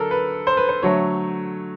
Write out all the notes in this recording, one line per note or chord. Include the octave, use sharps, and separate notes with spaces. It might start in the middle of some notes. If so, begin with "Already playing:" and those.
Already playing: D3 F#3 D4 A4 A#4
B4
C5
B4
C5
D3 F#3 A3 C#5